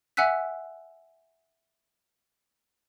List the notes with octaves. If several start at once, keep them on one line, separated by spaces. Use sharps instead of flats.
E5 F#5 G#5 E6 F#6 B6